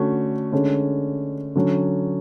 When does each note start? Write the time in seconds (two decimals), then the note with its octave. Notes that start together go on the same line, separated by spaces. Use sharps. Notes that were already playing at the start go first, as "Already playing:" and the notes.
Already playing: D3 A3 C#4 F#4
0.52 D3 G#3 C#4
1.55 D3 F#3 C#4